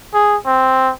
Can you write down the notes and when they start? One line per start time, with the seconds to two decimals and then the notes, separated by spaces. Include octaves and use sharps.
0.14 G#4
0.46 C4